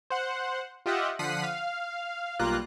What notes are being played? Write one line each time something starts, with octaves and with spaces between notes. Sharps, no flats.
C5 F#5
F4 G4 D#5 E5 F#5
D3 F3 F#5 B6 C7 D#7
F5
B1 G3 A#3 F4 A#5 F#6